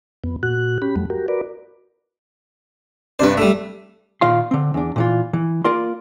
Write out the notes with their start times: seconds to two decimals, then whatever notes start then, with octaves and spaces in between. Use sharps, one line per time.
0.24 F2 B3
0.43 A#2 F#4 F#6
0.82 C#4 G4 B5
0.96 F2 F#3 G3 A3
1.10 F#4 G4 A#4
1.28 F#4 A#4 B4 D5
3.19 G2 C3 D4 B4 C5
3.37 G3 A3 E5
4.21 A#2 D#3 F4 F5 C6
4.51 D3 C4
4.74 E2 D4
4.96 A#2 E3 F4
5.33 E3
5.64 A#3 F4 A#4 D5 C6